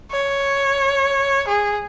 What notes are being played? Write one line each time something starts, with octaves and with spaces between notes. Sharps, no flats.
C#5
G#4